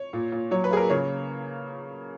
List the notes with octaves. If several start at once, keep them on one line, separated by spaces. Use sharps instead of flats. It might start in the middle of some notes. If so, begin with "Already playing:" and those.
Already playing: C#5
A#2
A#2
F#3 C#5
B4
A#3 G#4
A#4
C#3 C#5